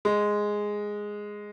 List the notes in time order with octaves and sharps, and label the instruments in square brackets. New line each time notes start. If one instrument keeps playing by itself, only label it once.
[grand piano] G#3